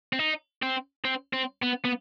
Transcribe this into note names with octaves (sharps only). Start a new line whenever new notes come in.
C4
D#4
C4
C4
C4
B3
B3